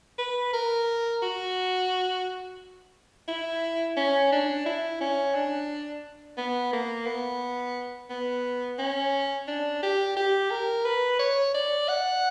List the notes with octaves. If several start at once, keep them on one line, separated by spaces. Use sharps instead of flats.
B4
A#4
F#4
E4
C#4
D4
E4
C#4
D4
B3
A#3
B3
B3
C#4
D4
G4
G4
A#4
B4
C#5
D5
F#5